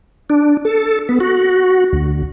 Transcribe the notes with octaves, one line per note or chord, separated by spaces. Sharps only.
D4
A4
B3
F#4
D2